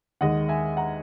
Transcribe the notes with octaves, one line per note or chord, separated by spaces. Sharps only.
D#2 D#3 G#3 D#5 F#5
E5 G#5
F#5 A#5